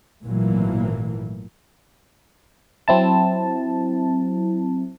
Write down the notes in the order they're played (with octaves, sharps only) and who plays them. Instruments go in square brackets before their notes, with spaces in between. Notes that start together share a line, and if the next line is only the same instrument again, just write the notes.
[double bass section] G#1 A#2 E3 F#3 A3 A#3
[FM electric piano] F#3 C4 E4 A5